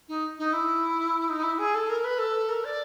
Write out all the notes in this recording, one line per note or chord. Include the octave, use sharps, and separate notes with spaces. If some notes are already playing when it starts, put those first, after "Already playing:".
D#4
D#4
E4
D#4
E4
G#4
A4
A#4
B4
A4
A#4
D5